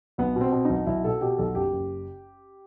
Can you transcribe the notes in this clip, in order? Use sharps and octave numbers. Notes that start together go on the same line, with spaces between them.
B1 B3
B2 C4
B2
B1 D#4
B1 E4
B2 A4
B2 G4
B1 A4
F#1 G4
F#1